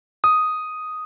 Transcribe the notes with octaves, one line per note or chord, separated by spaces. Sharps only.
D#6